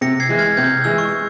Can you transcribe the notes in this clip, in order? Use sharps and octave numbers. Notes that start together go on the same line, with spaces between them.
C3 A#6 C#7
G#6 C7
E3 G#3
F6 G#6
C3 G6
E3 G#3 E6
C#6
G#3